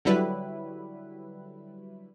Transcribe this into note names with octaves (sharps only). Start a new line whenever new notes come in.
D3 F#3 G3 E4 B4